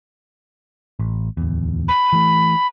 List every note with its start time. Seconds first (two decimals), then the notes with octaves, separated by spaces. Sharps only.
0.99 A1
1.37 D1 E2
1.88 B5
2.13 E3 A3